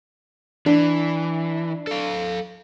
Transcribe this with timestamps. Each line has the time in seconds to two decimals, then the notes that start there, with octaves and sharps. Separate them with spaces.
0.66 E3 D4
1.87 A4 F5